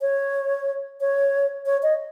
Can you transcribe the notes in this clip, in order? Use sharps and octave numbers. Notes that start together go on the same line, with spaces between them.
C#5
C#5
C#5
D#5